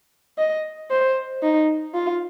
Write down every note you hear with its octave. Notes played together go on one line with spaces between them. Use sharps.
D#5
C5
D#4
F4